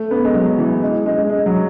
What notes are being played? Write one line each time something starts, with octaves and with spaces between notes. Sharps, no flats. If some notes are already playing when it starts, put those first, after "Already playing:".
Already playing: A3
B3
G#3
F#3
E3
G#3
G#3
G#3
G#3
F#3